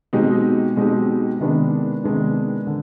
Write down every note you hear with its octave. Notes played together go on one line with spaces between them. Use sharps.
B2 G#3 C4 D#4 G4
B2 G#3 C4 D#4 G4
C3 D#3 G#3 B3 D4
C3 D#3 G#3 B3 D4
D3